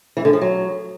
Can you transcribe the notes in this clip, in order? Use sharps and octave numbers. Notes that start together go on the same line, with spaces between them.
E3
D3
F3
F#3